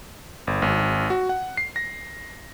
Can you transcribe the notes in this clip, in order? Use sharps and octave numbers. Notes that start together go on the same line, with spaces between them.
G1
G#1
F#4
F#5
C7
A#6